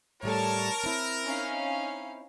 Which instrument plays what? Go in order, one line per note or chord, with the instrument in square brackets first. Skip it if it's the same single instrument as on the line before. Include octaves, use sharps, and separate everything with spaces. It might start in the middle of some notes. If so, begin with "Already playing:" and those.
[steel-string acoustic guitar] A2 G3 A4 [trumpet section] A#4 [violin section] C#5 A5
[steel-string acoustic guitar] C4 E4
[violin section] C#4 D#4 F5